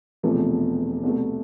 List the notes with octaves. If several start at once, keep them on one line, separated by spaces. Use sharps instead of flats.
E1 E2 C3 F3 A3
C2 B2 A3